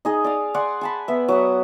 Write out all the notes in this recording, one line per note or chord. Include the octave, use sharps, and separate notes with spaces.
D#4 G#4 D#5
D5 F5 D#6
D5 F#5 G#5 C6
G#5 A5 B5
B3 E5
F#3 F#5 D#6